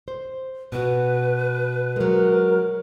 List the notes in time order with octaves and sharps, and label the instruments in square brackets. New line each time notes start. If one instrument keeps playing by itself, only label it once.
[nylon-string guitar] C5
[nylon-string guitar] B2 F#4 [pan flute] B4
[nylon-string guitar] F#3 G#3 [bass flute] A#4